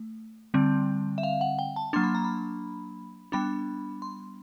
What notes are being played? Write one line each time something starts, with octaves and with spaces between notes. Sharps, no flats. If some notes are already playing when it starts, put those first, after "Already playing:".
Already playing: A3
D3 G3 C4
E5
F5
F#5
G5
A5
F#3 A#3 D4 C6
B5
A#5
B5
G3 B3 D4 B5
C6